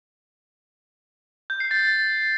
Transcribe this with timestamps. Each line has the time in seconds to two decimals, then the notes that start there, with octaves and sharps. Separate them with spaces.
1.50 G6
1.60 C7
1.71 A6